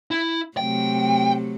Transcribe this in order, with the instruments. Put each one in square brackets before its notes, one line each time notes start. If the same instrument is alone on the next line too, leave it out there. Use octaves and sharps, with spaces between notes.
[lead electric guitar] E4
[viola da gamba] C3 F#3 A3 [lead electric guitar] G5